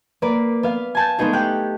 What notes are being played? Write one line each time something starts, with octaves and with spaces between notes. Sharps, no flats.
A#3 B4 D5
B3 F5
G#5 A5 G6
G#3 A3 B3 D#4 G#4
G4 G5 F#6